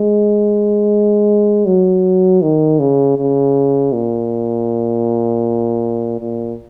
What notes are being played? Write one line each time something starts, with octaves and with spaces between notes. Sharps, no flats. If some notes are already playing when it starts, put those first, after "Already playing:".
Already playing: G#3
F#3
D#3
C#3
C#3
A#2
A#2